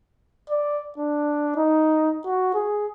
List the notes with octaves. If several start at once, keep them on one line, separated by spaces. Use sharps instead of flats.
D5
D4
D#4
F#4
G#4